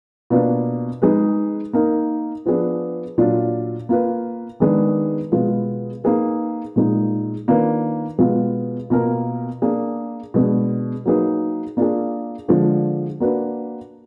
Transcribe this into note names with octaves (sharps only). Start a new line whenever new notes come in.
B2 A#3 D4 F4 B4
G#3 D#4 G#4 B4
A#3 D#4 A#4
F3 B3 D4 G#4
A#2 F#3 D4 F4
A#3 F4 B4
D#3 G#3 B3 D4 G#4
B2 G#3 B3 F4
A#3 D#4 G#4 B4
A#2 G#3 D#4
D#3 A#3 D4 F4 B4
B2 G#3 B3 F4
B2 A#3 F4 A#4
A#3 D4 G#4
B2 G#3 D4
F#3 A#3 D#4 G#4 B4
A#3 D4 F4 G#4
D3 F3 G#3 D4
A#3 D4 F#4 B4